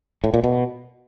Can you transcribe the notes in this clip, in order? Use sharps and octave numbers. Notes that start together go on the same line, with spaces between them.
A2
A#2
B2